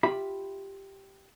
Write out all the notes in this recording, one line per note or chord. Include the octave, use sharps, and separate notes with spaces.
F4 G4 E5 B5